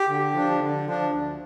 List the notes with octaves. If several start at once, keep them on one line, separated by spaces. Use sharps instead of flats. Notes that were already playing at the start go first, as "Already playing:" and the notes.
Already playing: G4
D3
F3 D4
D3
F3 D4
D2